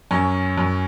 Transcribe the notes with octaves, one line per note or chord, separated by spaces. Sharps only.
F#2 C#4
F#2